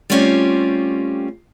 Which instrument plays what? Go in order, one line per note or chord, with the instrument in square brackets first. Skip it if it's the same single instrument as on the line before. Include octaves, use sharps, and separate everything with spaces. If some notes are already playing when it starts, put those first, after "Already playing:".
[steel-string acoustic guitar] G3 A3 C4 C#4 F4 G4